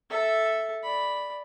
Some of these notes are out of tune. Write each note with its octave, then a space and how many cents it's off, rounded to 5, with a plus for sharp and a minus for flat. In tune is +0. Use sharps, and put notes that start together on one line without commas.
A4 +0 E5 +0
D5 +0 B5 +0